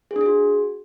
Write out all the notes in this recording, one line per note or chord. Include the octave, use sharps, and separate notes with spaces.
G#4
D4
G#4
F#4